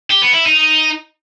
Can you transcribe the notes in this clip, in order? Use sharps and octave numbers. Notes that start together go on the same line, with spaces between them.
G4
B3
E4
D#4